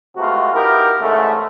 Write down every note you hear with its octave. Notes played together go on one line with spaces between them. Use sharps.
C3 G#3 A3 B3 F4 F#4
B3 D#4 E4 G4 A#4
E2 G#2 C#3 G#3 A3